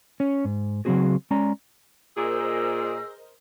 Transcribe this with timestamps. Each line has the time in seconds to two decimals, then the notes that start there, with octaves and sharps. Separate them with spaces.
0.20 C#4 C#5
0.45 G#2
0.85 C#3 F#3 A3 C4 F#4 G#4
1.31 G#3 C#4 D5 A#5
2.17 A#2 G#4 A#4 C5 D#5 E6